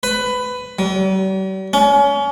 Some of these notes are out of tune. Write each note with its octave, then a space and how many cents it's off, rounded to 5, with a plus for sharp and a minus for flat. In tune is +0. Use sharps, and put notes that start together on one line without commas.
B4 +15
G3 -45
C#4 +30